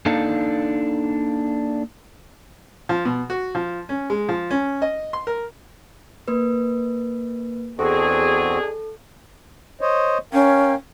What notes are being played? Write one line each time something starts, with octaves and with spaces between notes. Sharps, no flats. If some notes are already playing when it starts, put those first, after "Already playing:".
A#3 D4 D#4 A4 F5
F3
B2
F#4
F3
C#4
G#3
F3
C#4
D#5
C6
A#4
A#3 B4
E2 B2 C4 D4 F#4 G#4 A4
C5 C#5 D#5
C#4 A#4 F5 G5